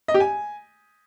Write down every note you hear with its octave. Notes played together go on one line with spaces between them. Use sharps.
D#5
G4
G#5